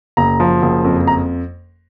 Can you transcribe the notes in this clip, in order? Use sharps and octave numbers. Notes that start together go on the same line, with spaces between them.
F#1 A#5
F3
F#1
F2
A#5